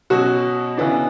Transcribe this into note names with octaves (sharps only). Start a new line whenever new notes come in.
B2 F#3 C#4 F#4
C#3 E3 B3 D4